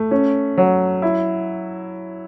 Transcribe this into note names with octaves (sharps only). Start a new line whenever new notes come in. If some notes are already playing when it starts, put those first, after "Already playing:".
Already playing: A3
C#4
F#3
E4